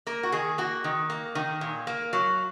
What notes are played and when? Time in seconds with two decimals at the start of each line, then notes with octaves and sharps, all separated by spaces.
0.07 A#3 A#4
0.23 F#4
0.32 D#3 G#4
0.58 A#3 F#4
0.84 D#3
1.10 A#3
1.35 D#3
1.61 A#2
1.87 A#3
2.13 F#3